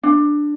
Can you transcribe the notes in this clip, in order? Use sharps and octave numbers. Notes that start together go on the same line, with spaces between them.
D4